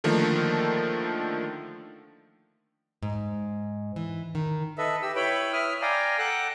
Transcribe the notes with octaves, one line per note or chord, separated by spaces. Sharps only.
D3 D#3 F3 A3 A#3
G#2
E3
D#3
A4 B4 D#5 E5
G4 E6
E4 B4 C#5 G5 B5
E4 E5 D#6 F6
D5 F5 G5 G#5 A#5
A4 F#5 G5 A5 A#5 F#6